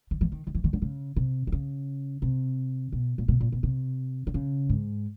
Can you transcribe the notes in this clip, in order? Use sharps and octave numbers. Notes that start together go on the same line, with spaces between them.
D#3
E3
D#3
D#3
E3
D#3
D3
C#3
C3
D3
C#3
C3
B2
A#2
B2
A#2
B2
C3
D3
C#3
G#2